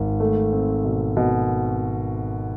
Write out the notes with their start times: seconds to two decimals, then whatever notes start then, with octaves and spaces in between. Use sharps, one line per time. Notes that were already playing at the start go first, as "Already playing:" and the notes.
Already playing: G#1
0.20 A3
0.53 C4
0.84 B2
1.17 B2